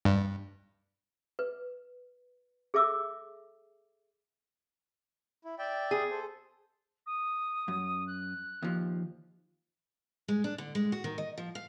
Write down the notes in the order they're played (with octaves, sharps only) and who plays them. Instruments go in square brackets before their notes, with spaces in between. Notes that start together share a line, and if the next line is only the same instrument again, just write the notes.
[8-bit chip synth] G2
[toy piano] B4
G#4 A4 E5 D6 E6
[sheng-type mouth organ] E4
D5 E5 G5
[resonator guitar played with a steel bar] G#4
[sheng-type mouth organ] A4 C5
[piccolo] D#6
[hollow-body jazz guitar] F#2
[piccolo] F#6
[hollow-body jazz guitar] D#2 F3
[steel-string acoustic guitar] G#3
D4
D3
G#3
F#4
D#3
D#5
F3
F5